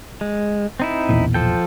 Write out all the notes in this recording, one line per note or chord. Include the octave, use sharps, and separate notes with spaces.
G#3
C4 D#4 E4
B1 E2 A#2
F3 A4 G5